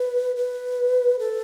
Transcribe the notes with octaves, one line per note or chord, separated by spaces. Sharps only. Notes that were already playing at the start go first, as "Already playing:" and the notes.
Already playing: B4
B4
A4